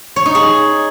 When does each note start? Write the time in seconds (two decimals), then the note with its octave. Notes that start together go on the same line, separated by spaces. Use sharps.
0.16 C#5
0.26 D#4
0.35 G#4